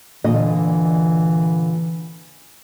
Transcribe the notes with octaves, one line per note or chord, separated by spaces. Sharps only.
A#2 D3 E3 D#5